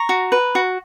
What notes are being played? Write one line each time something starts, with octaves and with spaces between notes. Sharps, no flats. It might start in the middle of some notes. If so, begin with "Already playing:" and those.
Already playing: A#5 C#6
F#4
B4
F#4